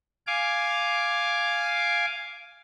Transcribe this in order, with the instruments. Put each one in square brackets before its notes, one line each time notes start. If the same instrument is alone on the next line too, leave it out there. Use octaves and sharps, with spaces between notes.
[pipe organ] F5 G#5 D6